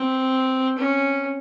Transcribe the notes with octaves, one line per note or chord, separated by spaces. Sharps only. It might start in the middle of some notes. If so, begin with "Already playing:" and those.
Already playing: C4
C#4